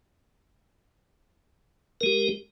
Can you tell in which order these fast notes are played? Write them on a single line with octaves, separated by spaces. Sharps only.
A#4 G#3 G4